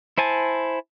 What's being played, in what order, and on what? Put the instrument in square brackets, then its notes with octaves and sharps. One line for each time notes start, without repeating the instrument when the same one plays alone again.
[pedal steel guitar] E4 C5 G#5 A5